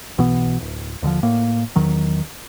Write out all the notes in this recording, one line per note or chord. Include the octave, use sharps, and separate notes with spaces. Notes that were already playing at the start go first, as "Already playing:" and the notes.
B1 B2 E3 B3
D1
D#2 D3 D#3 F3
A2 A#3
E2 D#3 F#3